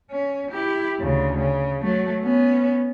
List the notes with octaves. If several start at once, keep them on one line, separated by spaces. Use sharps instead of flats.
C#4
E4 G4
D2 C#3
C#3
F#3 A3
B3 C#4